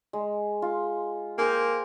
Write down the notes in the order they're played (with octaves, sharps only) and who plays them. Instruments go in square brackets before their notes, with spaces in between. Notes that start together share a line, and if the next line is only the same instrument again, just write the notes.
[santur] G#3
F4
[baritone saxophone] A#3 [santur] G#4 C5 G5